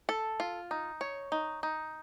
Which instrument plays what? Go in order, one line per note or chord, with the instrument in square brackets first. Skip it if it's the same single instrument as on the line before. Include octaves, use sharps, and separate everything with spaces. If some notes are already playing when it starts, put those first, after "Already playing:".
[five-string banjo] A4
F4
D#4
C#5
D#4
D#4